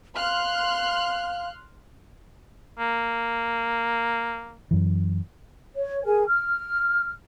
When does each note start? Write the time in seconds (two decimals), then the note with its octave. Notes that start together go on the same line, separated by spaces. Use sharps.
0.16 F5 C6 F6 F#6
2.79 A#3
4.71 F#2 E3
5.75 C#5
6.05 G#4 A#4 G#5
6.27 F6